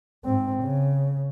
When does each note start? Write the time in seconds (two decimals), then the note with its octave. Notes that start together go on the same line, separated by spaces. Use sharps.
0.25 G#2 C4
0.63 C#3